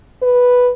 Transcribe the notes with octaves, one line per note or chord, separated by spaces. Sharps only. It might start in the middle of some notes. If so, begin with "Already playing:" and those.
B4